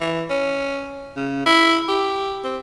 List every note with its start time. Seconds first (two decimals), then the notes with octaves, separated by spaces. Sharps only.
0.01 E3
0.30 C#4
1.16 C#3
1.46 E4
1.88 G4
2.44 C4